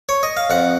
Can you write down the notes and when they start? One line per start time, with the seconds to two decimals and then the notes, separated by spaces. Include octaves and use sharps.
0.09 C#5
0.23 D#5
0.37 F5
0.50 F2 F#5